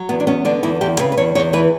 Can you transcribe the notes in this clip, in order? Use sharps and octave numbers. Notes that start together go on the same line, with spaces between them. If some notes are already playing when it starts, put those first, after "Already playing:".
Already playing: F#3
E2 B3
D4
B3 C#4
D3 D4
E2 E4
E2 G4
C#3 B4
B4
E2 C#5
E2 C#5
E3 B4